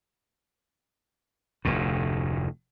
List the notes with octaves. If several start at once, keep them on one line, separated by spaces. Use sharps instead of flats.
F1 D2 A2